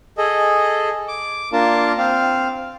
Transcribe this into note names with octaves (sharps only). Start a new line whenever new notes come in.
G#4 A4 D#5
D6
A#3 D4 F4 A#4 A5
C4 F5